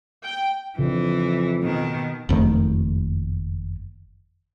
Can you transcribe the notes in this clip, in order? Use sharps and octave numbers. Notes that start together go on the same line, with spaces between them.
G5
F2 C#3 E3 F3 D4
B2 D#3
F#1 F2 D#3 A3